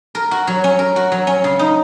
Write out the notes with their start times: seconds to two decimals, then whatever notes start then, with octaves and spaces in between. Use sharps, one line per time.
0.15 A#4
0.31 F#4
0.47 F#3
0.64 C#4
0.79 A#4
0.96 F#4
1.12 F#3
1.27 C#4
1.44 C#3
1.59 D#4